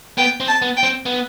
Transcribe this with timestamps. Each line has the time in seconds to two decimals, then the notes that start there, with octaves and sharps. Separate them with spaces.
0.18 B3 G5
0.40 C4
0.48 A5
0.62 B3
0.77 G5
0.83 C4
1.06 B3